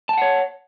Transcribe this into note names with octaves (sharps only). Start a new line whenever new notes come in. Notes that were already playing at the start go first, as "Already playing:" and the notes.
C#5 F#5 G5 A5